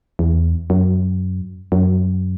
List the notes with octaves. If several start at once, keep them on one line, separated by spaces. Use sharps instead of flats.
E2
F#2
F#2